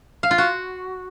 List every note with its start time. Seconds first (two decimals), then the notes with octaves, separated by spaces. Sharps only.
0.23 F5
0.31 F4
0.38 F#4